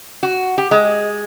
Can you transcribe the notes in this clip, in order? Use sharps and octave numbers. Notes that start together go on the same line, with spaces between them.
F#4
G4
G#3